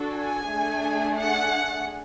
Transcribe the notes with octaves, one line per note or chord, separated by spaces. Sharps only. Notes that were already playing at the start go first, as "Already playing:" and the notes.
Already playing: D4 F#4 A4
G#5
A3 D4 G#4
F#5